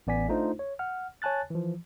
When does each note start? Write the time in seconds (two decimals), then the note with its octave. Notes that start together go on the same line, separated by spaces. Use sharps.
0.07 A1 B3 D5 G#5 B6
0.28 A3 D4 D#4 F4 C5
0.59 C#5
0.79 F#5 F6
1.22 C#5 G#5 A5 F#6 A6
1.50 E3 F3